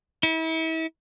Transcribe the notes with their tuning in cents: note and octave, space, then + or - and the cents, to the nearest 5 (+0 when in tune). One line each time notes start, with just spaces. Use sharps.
E4 -35